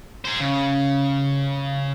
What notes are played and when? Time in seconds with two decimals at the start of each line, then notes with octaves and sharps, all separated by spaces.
0.24 G#4 C5
0.40 C#3